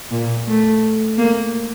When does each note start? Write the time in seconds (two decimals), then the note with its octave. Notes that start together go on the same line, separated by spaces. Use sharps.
0.11 A#2
0.48 A3
1.18 A#3